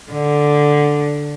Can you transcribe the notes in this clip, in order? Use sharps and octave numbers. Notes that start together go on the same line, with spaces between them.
D3